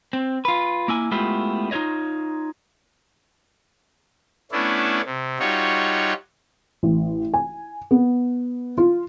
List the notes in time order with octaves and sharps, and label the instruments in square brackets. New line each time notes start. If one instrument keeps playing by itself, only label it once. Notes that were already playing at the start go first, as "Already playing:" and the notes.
[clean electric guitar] C4
F4 B4
A#3 E4 G#5
G#3 A3 B3 E4 F4 G4
D#4 F4 C5 C#5 D#5
[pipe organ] A3 B3 C#4 D4 E4
C3
G3 D#4 F4 F#4 C#5
[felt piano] A1
G#5
B3
F4